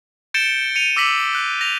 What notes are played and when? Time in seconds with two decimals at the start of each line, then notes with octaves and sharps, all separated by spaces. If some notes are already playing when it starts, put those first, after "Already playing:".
0.34 G6 A6 C#7 D7 E7 G7
0.75 C#7 D#7 F7
0.96 D6 E6 A#6 B6 F#7
1.35 F#6
1.61 A#6 F7